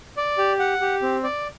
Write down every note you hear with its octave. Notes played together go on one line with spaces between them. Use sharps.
D5
G4
F#5
G4
C4
D5